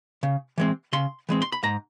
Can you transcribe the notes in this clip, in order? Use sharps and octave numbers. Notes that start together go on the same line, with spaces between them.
C#3
E3 G#3 C4
C#3 C6
E3 G#3 C4
C6
B5
G#2 A#5